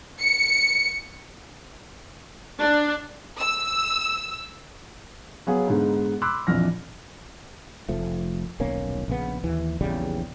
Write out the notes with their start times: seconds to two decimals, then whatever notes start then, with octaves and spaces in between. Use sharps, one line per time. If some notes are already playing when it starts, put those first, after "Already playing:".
0.19 C#7
2.59 D4
3.39 E6
5.47 F#3 B3 G#4 F5
5.67 G#2 D3 G#3 B3 D#4
6.22 B5 C6 D6 E6 F#6
6.47 A#1 F2 E3 F6 A#6
7.89 F1 F3 A3
8.60 D#1 B1 A#3 C#4
9.08 A#1 C#3 B3
9.44 D#2 E3
9.81 A#1 E2 C#3 G3